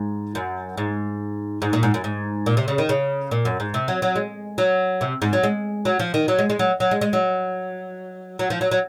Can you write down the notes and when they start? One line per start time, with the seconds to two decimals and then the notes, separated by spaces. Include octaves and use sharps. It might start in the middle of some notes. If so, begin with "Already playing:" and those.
Already playing: G#2
0.35 F#2
0.77 G#2
1.62 G#2
1.73 A#2
1.83 G#2
1.94 F#2
2.04 G#2
2.46 A#2
2.57 C3
2.68 C#3
2.78 D#3
2.89 C#3
3.31 A#2
3.45 F#2
3.60 G#2
3.74 C3
3.88 F#3
4.02 F#3
4.16 G#3
4.58 F#3
5.01 C3
5.22 G#2
5.33 F#3
5.43 G#3
5.85 F#3
5.99 F3
6.14 D#3
6.28 F#3
6.39 G#3
6.50 G#3
6.59 F#3
6.80 F#3
6.91 G#3
7.01 G#3
7.13 F#3
8.39 F#3
8.50 F3
8.61 F#3
8.71 F#3